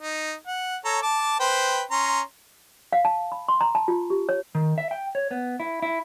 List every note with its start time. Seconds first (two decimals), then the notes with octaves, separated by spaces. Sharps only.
0.01 D#4
0.47 F#5
0.85 A4 C#5 A#5
1.02 A5 D6
1.40 B4 C5 G5
1.91 C#4 A#5 C6
2.92 F5
3.05 A5
3.32 B5
3.49 C6
3.61 A#5
3.75 A5
3.88 F4
4.10 G4
4.29 C#5
4.55 D#3
4.78 E5
4.91 G5
5.15 C#5
5.31 B3
5.60 E4
5.82 E4